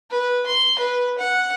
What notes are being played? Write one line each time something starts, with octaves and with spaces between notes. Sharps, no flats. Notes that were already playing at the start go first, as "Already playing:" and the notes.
B4
C6
B4
F#5